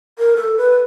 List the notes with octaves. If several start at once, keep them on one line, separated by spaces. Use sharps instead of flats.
A#4
A4
B4